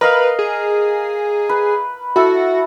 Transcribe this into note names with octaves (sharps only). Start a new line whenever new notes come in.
A#4 B4 D#5 F5
G#4
B4
E4 F#4 A4